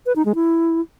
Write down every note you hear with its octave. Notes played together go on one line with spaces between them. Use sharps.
B4
D#4
G#3
E4